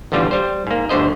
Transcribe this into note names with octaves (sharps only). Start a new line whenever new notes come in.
A1 E2 D3 G3 F4
G3 C5
G#2 A#3
G1 D2 D3 C5 D#5